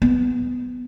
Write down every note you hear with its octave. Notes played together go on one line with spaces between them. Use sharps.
B3